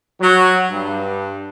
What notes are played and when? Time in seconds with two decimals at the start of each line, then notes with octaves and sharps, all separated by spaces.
0.21 F#3
0.70 G2